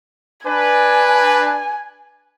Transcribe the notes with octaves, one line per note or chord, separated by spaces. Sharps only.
D4 B4 G#5